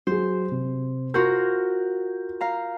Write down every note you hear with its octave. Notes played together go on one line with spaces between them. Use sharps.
F#3 G#4 C5
C3
F4 F#4 A#4 G6
F5 A#5